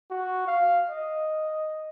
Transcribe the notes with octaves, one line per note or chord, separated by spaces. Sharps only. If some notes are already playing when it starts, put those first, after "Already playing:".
F#4
F5
D#5